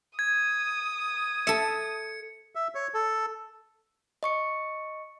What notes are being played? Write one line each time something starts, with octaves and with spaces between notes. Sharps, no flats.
D#6 G#6
A4 E5 C#7
E5
C#5
A4
D#5 C#6 C#7